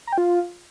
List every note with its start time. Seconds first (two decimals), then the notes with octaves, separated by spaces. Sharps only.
0.07 A#5
0.12 G5
0.18 F4